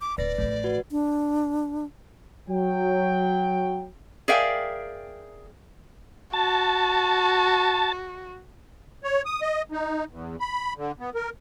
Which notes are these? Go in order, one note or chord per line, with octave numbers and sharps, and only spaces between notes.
D6
D1 B4 D5 A#6
A1 F3 A3
F#4 B4
D4
F#3 G5
G#4 A#4 D5 E5 F5 G5
F#4 A5
C#5
D#6
D#5
D#4
E2
B5
D3
B3
A#4